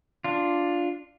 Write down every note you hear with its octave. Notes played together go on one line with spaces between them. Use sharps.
D4 F4